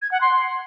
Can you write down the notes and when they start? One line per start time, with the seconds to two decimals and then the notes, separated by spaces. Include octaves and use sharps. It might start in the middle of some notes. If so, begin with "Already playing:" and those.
0.02 G#6
0.11 F#5
0.21 C6